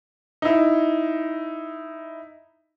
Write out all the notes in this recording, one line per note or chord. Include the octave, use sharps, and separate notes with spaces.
D#4 E4